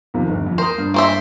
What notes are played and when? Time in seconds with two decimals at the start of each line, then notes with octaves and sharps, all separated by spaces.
0.14 D#2 C3 F3
0.29 G1
0.46 F2
0.58 A#4 C5 D#6
0.78 G2
0.94 A#3 C5 E5